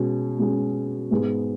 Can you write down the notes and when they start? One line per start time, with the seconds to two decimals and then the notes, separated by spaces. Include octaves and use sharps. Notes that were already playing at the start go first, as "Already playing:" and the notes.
Already playing: B2 G#3 C#4
0.39 B2 G#3 C#4
1.11 G#2 G#3 B3 G#4